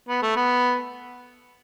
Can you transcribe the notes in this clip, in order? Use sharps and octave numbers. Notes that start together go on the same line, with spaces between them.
B3
A3
B3